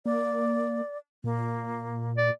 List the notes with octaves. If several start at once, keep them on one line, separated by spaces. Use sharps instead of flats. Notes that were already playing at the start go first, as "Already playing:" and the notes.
A#3 D5
A#2 A#3
D5